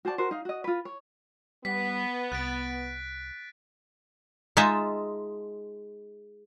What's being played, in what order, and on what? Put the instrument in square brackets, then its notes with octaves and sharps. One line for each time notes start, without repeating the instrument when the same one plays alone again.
[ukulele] F#4 C5 D5 A5
F#4 A#4 C5
D#4 F5
F#4 D#5
F4 B4
C#5
[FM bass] G3 [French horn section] B3 [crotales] B6
[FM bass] C2 [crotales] F#6 A6 D7
[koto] G#3 D#4 F4 D#5 E5 A5